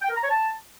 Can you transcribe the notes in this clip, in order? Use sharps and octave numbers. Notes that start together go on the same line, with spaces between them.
G5
A#4
A#5
C#5
A5